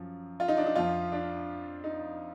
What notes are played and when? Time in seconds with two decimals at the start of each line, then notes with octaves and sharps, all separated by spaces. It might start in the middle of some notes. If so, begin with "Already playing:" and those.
Already playing: F#2 F3
0.40 F4
0.48 D#4
0.57 D4
0.66 D#4
0.75 F2 F3 F4
1.12 D4
1.84 D#4